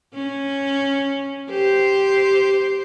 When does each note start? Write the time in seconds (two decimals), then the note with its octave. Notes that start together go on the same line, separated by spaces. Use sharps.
0.14 C#4
1.50 G4 C5